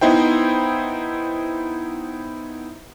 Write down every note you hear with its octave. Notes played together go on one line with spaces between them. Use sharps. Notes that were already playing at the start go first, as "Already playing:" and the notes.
B3 D#4 E4 C5 G5